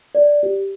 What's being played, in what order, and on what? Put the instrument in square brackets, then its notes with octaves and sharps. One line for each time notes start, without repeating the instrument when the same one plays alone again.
[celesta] D5
G4